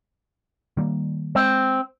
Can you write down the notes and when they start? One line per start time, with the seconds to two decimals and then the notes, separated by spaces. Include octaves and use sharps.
0.77 D#3 G3 A#3
1.35 G#3 C4